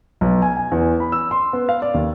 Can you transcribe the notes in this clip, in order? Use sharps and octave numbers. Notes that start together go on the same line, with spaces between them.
B1
G#5
G#5
E2
B5
E6
C6
B3
F5
D5
D#2